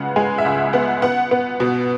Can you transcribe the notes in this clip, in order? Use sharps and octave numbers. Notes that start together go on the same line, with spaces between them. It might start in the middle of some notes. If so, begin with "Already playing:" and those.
Already playing: C#3 G#3 B3 F#5
G#3 G#5
E5
C#2 F#5
B3 F#5
B3 F#5
B3
B2